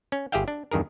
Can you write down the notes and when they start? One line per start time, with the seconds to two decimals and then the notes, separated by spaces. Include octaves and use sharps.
0.12 C#4
0.32 G1 G4 G#4 E5 F5 G5
0.48 D4
0.71 E2 G2 D#3 G#4 A#4